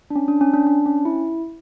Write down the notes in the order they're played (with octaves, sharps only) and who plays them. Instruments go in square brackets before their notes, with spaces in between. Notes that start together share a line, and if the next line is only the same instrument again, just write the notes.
[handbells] D4
C#4
D4
C#4
D4
D4
C#4
E4